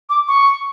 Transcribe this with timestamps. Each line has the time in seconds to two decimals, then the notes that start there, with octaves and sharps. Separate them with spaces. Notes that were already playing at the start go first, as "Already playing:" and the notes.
0.09 D6
0.28 C#6